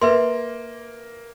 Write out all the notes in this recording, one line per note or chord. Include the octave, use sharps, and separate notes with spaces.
A#3 B4 E5 C6